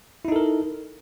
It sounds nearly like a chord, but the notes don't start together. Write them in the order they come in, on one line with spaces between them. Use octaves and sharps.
E4 D#4 A4 A#4